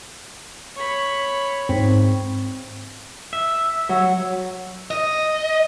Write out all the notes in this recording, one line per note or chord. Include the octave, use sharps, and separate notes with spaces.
C#5 B5
G#2 C4
E5
F#3
D#5